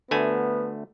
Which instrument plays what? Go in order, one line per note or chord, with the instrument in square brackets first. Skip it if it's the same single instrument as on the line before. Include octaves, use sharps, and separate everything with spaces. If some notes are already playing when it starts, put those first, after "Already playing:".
[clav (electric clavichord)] D2 A3 G#5 [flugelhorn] B3